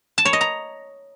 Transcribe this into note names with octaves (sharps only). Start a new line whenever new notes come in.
A5
C#5
D#5
A#5